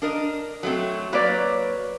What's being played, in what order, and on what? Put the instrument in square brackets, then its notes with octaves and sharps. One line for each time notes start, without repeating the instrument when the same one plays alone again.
[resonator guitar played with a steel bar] D4 A#4 D#5
F#3 A3 C4
[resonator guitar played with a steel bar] F#3 A#3 C#5 [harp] B4 D5